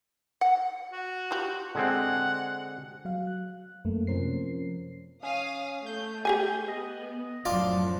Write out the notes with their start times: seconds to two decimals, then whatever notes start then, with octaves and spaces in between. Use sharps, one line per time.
0.41 F#5
0.93 F#4
1.31 F4 G4
1.75 D3 G#3 C4 F#5
3.05 F#3 F5
3.27 F#6
3.85 F#2 A3 A#3
4.07 C3 F3 C#4 A#4 C5 C7
5.23 C#4 F5 D#6
5.86 A3 G6
6.25 G4 G#4 G#5
6.68 B3 D#5
7.45 F#2 A2 F3 D4 F4 D5